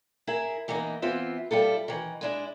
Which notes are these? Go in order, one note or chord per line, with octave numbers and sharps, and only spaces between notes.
E4 G#4 A#4
E3 A#3 B3 D#4
E3 B3 C4 F4 E5
G3 E4 F4 A4
D#3 E3
G#3 D4 E4